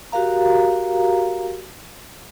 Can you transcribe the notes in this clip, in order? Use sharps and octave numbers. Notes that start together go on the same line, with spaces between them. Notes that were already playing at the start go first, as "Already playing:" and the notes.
F#4 G4 A#4 F5 A#5